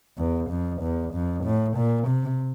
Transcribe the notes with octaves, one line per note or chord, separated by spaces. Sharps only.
E2
F2
E2
F2
A2
A#2
C3